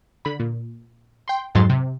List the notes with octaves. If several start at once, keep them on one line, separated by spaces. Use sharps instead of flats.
D3 B5
A#2
G5 C6
F2 G#2 F#3 C6 A6
C3